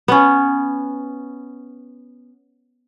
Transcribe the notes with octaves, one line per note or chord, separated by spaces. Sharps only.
B3 C#4